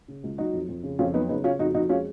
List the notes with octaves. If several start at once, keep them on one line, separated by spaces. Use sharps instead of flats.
C#3
C#2
F#3 D#4 F#4
F2
F2
C#3
F2 C#4 F4
F#3 B3 D#4
C#3 B3 D#4
C#3 C#4 F4
F2 D#4 F#4
F2 D#4 F#4
G#3 C#4 F4